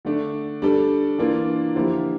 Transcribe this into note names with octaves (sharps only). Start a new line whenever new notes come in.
D3 A3 D4
G3 D4 A4
E3 A#3 D4 F4 A#4
D3 F3 A#3 E4 G4